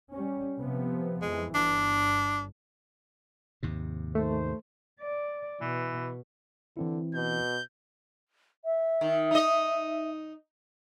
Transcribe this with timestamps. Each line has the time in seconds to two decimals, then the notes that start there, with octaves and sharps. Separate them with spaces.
0.13 G3 C#4
0.59 C3 F3 B3
1.21 F2 E3 G#3
1.54 G1 D4
3.63 D#2 G#2 C3
4.15 D#3 A3 C5
5.00 D5
5.61 B2 E3
6.77 D3 E3 C4 E4
7.14 B2 G6
8.65 E5
9.01 D#3
9.31 D#4 D#5